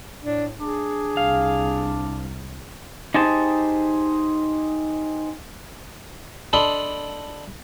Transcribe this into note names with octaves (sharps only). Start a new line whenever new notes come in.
A2 D4
D4 G#4
C2 F5
D#4 G4 G#4 C5 A5
D4 A4 D#5 B5 C6